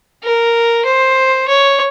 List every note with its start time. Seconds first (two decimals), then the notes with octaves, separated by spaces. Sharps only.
0.23 A#4
0.85 C5
1.48 C#5